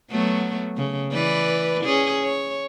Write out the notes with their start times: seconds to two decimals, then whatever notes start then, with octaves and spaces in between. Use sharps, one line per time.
0.11 F#3 A3 B3
0.77 C#3
1.12 E3 B4 D5
1.84 C#4 G#4
2.24 C#5